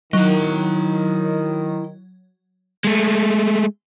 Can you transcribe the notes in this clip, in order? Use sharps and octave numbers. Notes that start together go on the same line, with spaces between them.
D#3 F#3 E4 D#5
G#3 A3